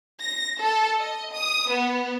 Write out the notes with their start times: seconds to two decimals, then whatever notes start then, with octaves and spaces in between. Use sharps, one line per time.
0.21 A#6
0.61 A4
1.01 D#5
1.35 D#6
1.71 B3